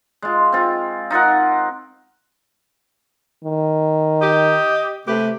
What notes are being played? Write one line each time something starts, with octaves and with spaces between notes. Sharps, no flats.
G#3 F4
C4 F4
D#4 F4 A#4 F#5
D#3
G4 D#5
C3 A3 G4 B4